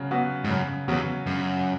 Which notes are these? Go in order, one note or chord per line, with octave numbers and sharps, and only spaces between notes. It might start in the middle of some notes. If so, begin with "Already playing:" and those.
Already playing: C#3 F#3
F#3 B3 F#4
G#2
F#2 C#3
E2 F#3 B3 F#4
F#2 C#3